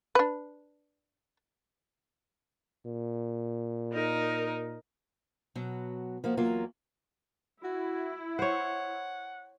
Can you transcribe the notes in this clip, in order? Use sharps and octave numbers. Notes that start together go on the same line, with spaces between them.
D4 B4
A#2
D#4 A#4
B2 F#3
F3 A#3 F#4
E2 F#3 A#3 F4
E4 F#4
C5 C#5 F#5